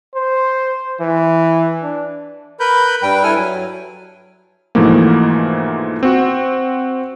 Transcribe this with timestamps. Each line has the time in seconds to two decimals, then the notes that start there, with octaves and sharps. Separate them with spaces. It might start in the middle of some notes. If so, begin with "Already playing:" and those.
0.15 C5
1.00 E3
1.83 D4
2.60 A#4 B4 B5 G6
3.03 G2 G3 B4 G5
3.23 E4 A4 G#5 F6
3.37 F#3
4.75 G#2 B2 E3 F3 A3 A#3
6.03 C4 F#4